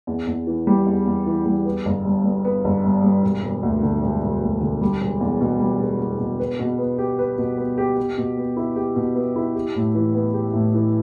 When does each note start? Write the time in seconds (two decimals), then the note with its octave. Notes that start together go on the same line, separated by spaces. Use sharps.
0.07 E2
0.27 E2
0.47 E3
0.67 G3
0.86 E2
1.06 E2
1.26 E3
1.46 G3
1.65 B3
1.85 G1
2.05 G2
2.24 G3
2.45 B3
2.64 G1
2.84 G2
3.04 G3
3.23 E1
3.43 E1
3.63 D2
3.83 D3
4.03 E1
4.22 E1
4.42 D2
4.61 D3
4.81 G3
5.01 E1
5.21 E2
5.41 B2
5.60 G3
5.80 E1
6.00 E2
6.20 B2
6.39 B4
6.60 B2
6.78 B3
6.98 G4
7.19 B4
7.38 B2
7.58 B3
7.78 G4
7.97 G4
8.18 B2
8.37 B3
8.57 E4
8.76 G4
8.96 B2
9.15 B3
9.36 E4
9.55 G4
9.75 A2
9.95 E3
10.15 B3
10.34 G4
10.53 A2
10.74 E3